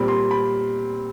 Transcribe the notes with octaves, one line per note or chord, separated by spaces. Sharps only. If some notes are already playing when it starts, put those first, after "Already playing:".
Already playing: A#2 G3 C4 B5
C6
B5